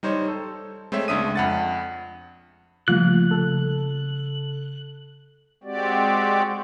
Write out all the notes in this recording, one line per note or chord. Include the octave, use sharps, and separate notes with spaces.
G3 D#4 C5 C#5
A4
G#3 A3 C4 C5 C#5 E5
C#2 G#3 D4 E5 D#6 D#7
F2 F#5 A6
C#3 F3 G3 A3 A#3 F4 F#6
C#3 A4
G#3 C4 F#4 G4 D5